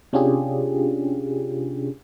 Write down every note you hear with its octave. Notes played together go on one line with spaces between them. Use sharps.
C3 C#4 D4 F4 G4 G#4